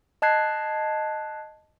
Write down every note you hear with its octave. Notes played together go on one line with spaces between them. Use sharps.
D#5 A5 F#6 G#6 C7